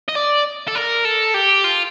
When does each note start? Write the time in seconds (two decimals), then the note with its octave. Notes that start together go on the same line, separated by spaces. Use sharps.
0.09 D#5
0.16 D5
0.68 A4
0.75 A#4
1.05 A4
1.34 G4
1.64 F4